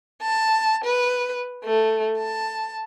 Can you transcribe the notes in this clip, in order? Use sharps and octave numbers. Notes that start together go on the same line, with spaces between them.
A5
B4
A3
A5